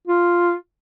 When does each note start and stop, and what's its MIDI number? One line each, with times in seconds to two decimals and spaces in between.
0.08 0.55 65